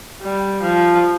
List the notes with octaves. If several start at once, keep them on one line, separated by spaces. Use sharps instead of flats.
G3
F3